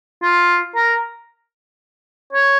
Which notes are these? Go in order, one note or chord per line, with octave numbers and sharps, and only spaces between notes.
F4
A#4
C#5